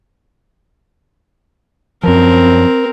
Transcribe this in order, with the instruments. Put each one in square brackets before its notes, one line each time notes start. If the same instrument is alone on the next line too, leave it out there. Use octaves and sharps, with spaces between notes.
[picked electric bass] F#2 F3 [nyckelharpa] C4 A#4